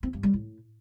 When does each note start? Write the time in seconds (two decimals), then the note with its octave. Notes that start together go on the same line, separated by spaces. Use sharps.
0.03 C4
0.13 G2
0.23 G3
0.33 A2